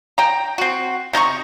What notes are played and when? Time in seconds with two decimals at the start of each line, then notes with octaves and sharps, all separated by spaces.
0.18 G5 A#5
0.58 C4 F#4
1.13 C3 D#4 A#5 C#6